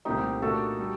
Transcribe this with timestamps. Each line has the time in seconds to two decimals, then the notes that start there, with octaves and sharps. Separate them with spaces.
0.05 C2 A#2 A3 C4 D#4 G4
0.42 A#2 A3 D4 F#4 A4
0.79 G3